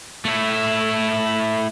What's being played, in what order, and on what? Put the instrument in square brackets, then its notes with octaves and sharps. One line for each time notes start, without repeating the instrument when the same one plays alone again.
[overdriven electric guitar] A3 E4